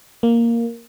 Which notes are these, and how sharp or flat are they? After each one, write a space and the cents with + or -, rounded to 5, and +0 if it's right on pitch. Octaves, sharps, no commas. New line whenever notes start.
A#3 +0